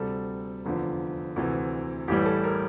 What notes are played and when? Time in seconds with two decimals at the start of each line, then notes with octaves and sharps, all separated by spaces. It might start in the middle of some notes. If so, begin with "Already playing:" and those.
Already playing: D2 C3 G3 A4
0.65 F1 E2 D3 F3
1.36 D2 C3 E3
2.08 A1 A2 E3 G3 G4
2.26 A4
2.44 A#4